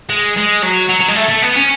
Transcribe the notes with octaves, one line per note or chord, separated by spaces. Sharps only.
G#3
G#3
F#3
F#3
F#3
G#3
A3
A3
B3
C#4